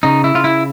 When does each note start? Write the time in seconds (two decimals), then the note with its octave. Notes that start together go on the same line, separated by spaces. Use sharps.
0.03 C#3 D#4
0.24 E4
0.35 C#3 F4
0.44 E4